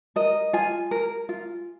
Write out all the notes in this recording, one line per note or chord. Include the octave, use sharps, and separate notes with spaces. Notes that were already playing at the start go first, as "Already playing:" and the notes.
A#4 D#5
F4 G#5
A#4
F4